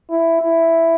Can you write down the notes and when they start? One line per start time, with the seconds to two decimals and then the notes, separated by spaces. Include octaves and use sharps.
0.10 E4
0.41 E4